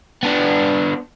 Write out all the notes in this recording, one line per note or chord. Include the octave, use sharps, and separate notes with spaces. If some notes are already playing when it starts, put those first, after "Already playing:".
B3 D4